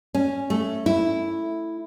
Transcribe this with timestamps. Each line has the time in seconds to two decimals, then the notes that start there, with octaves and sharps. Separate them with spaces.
0.14 C#4
0.50 A3
0.86 E4